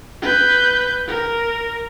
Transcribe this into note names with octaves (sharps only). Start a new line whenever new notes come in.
B4 G6
A#4